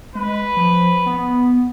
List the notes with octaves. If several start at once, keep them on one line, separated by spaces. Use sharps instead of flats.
G#3 B4
F3
B3